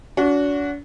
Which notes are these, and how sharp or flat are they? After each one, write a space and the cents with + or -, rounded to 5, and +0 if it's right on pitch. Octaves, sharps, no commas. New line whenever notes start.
D4 -40 F#4 -10